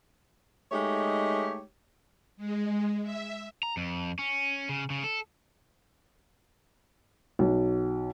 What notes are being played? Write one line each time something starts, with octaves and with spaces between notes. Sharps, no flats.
G#3 A3 D#4 G4 C#5
G#3
E5
A#5
F2
C#4
C#3
C#3
A4
B1